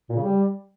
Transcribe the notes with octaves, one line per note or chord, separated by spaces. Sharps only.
A#2
C#3
G3